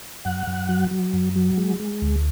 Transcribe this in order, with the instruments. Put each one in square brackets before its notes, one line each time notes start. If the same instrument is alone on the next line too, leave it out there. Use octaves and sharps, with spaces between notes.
[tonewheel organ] F#2 F#5
F#2
F#3
F#3
F#2
F#3
G#3
G#3
D2